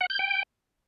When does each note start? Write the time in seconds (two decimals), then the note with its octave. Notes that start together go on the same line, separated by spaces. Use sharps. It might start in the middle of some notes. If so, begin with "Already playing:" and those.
0.01 F#5
0.10 G6
0.19 G5